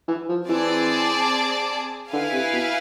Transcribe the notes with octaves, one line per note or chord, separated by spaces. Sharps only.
E3
F3
E3 C4 G#4 D5 A5
D3 E4 B4 F5 G#5
C3
B2